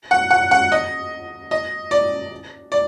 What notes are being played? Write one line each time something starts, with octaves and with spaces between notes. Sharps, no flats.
F#5
F#5
F#5
D#5
D#5
D5
D5